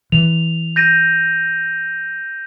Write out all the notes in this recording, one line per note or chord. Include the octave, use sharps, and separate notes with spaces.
E3 F7
G6 A#6 D#7